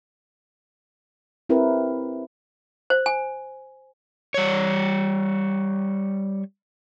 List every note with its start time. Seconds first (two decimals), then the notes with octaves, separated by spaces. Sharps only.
1.49 C4 E4 G4 A#4 B4
2.90 C5
3.06 G#5
4.34 G3 C#5